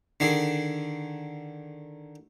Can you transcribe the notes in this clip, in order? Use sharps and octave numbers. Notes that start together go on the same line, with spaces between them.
D3 D#3 G#4